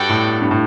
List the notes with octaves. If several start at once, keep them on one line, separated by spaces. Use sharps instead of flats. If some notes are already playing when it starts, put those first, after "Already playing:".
Already playing: G2 F#4 A4 D5 G5
A2
G2
A2